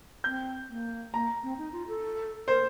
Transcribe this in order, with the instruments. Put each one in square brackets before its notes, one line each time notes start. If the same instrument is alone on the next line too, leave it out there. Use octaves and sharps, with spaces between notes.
[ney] C4 [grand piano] G6
[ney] A#3
[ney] A#3 [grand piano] A#5
[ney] C4
D#4
F4
A4
[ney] A#4 [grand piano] C5